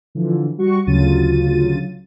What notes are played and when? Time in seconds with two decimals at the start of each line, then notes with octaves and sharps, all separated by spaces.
0.15 D3 E3 F3
0.58 G3 F#4 C#6
0.87 D2 C#3 F#3 F4 A6 D#7